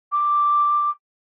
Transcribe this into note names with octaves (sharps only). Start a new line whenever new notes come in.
D6